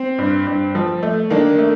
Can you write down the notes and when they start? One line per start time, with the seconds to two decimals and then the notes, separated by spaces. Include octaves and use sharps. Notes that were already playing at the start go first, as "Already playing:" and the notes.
Already playing: C4
0.18 G2
0.47 G2
0.75 F3
1.03 A3
1.30 D#3 A#3 D4
1.59 A3